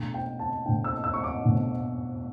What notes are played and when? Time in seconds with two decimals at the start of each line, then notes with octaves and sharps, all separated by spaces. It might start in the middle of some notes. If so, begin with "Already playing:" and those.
Already playing: B2 A3 D4
0.14 G5
0.39 A5
0.66 B2 A3 D4 G5
0.84 E6
1.04 E6
1.14 C#6
1.24 D6
1.43 B2 A3 D4